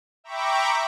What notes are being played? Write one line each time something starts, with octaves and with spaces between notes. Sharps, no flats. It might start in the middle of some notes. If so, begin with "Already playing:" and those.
E5 G5 A#5 B5 C#6 D6